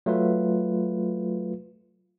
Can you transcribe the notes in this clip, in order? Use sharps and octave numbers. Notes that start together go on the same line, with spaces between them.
F#3 A3 F4 B4